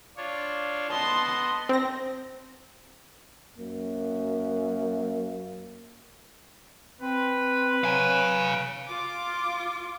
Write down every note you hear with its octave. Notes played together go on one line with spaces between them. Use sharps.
D4 F4 C#5
B3 D#5 A5 C6
C4 A#6
F#2 A#3
C4 B4
F#3 F5 G#5
F4 D6